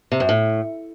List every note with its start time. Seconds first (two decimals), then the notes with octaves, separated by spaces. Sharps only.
0.12 C3
0.20 F#2
0.29 A2